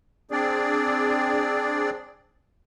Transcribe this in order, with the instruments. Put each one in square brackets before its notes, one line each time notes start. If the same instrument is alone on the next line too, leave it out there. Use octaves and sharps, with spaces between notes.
[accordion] C4 D4 G#4 D5